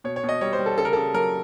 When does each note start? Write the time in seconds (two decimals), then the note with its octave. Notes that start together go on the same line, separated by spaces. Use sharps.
0.04 B2 C#5
0.16 C#5
0.23 B2
0.29 D#5
0.41 G3 C#5
0.53 C5
0.59 G3
0.66 A4
0.78 C#3 A4
0.85 A#4
0.93 C#3 A4
1.14 F#3 A#4